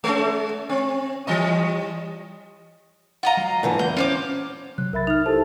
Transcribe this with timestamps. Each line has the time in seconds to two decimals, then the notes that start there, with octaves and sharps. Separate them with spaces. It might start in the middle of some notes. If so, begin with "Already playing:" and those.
0.04 G#3 C#4
0.69 C4
1.27 E3 G3 D#5
3.23 F4 D#5 F5 F#5 A#5
3.37 F#3
3.63 G#2 D3 E3
3.79 E2 G6
3.97 C#4 F4 C5 C#5 D6
4.78 C3 F#3 F#6
4.93 B1 A#4 E5 B5 A6
5.07 D#4 E5 F6
5.26 E4 G4 A4 C5 A5